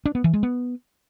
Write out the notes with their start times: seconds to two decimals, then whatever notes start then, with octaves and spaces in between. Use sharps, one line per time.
0.05 D4
0.15 B3
0.24 E3
0.34 G#3
0.43 B3